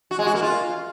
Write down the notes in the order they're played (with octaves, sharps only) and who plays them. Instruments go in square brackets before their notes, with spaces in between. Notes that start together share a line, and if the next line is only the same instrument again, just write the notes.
[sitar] F#4
G#3
F#4
A#3
F4